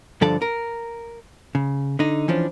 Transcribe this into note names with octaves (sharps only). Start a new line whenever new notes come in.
G2 D3 F3 A4 D5 A5
A#4
C#3
D3 D#4
E3 F3 C#4 D4